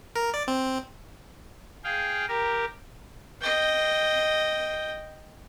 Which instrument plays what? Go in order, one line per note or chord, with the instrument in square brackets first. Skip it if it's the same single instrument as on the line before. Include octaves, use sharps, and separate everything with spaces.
[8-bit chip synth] A#4
D5
C4
[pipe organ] G#4 F5 G5
G4 A#4
[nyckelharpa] D#5 G5